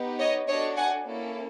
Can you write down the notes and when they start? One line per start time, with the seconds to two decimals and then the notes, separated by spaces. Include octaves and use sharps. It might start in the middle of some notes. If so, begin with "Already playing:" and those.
Already playing: B3 D#4 G4
0.18 C#5 D#5
0.47 D4 F#4 A4 C#5 D#5
0.76 F#5 G#5
1.05 A#3 C#4 E4 A4